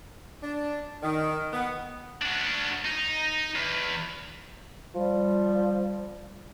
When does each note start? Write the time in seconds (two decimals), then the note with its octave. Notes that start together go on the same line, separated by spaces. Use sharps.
0.42 D4
1.02 D#3
1.52 B3
2.22 D4 F#4
2.85 D#4
3.55 E2
4.95 F3 G3